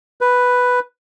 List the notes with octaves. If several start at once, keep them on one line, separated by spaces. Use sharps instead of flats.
B4